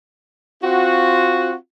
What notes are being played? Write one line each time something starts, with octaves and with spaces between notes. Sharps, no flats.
C4 F4 F#4